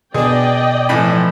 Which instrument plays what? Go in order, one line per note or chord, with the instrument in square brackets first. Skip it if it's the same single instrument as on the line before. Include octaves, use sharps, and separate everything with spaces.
[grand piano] B2 [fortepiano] D4 G#4 [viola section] D5 D#5 G5
[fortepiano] A2 G#5 B5 [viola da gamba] E3 F3